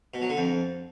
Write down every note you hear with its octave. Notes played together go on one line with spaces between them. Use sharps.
B2
F#3
D3
F2